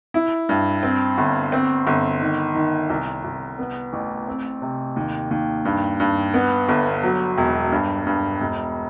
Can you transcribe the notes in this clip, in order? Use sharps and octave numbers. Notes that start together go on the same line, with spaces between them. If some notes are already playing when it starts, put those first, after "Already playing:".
E4
G2
C4
G1
C4
G1
D#3
D#3
C2
C2
B3
A1
C4
C3
D#2
D#2
G2
G2
B3
G1
F#3
E1
G2
G2
E1